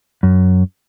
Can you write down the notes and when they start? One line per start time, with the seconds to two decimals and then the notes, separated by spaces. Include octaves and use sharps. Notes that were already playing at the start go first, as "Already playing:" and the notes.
0.23 F#2